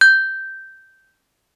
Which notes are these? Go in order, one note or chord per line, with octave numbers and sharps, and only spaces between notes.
G6